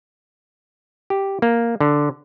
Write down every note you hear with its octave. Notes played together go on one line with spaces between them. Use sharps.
G4
A#3
D3